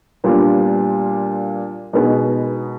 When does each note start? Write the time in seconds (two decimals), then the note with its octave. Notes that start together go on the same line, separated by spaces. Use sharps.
0.24 A#2 G3 B3 D4 F4
1.93 B2 G#3 B3 D#4 G#4